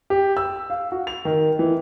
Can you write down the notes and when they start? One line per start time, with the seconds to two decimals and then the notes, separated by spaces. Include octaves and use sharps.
0.10 G4
0.37 E6
0.70 F5
0.92 F#4
1.07 F7
1.25 D#3
1.59 E3